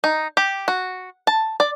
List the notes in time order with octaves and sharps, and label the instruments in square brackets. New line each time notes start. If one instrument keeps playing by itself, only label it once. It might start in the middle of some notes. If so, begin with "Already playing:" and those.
[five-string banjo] D#4
G4
F#4
A5
D5